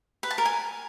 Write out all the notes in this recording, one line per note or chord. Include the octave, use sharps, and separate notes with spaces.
B4
A5
A#4
G#5